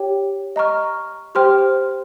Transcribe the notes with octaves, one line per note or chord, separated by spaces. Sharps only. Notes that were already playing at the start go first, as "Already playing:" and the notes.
Already playing: G4 C#5 G5
D#5 A#5 C#6 F6
G4 C5 G5 C6 F6